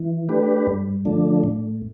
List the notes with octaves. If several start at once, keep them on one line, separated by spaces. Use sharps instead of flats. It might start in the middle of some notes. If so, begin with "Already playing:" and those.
Already playing: E3
A3 D4 G4 B4
G2
D3 F3 A3 D4
A2